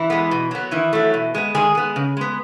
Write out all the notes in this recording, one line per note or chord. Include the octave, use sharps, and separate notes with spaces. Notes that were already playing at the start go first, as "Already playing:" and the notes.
Already playing: E3 E4
G#3 B3
B2
F#3 B3
D#3 E3 E4
F#3 A3
B2
G#3 B3
D#3 G#3 G#4
G#3 B3
C#3
G#3 B3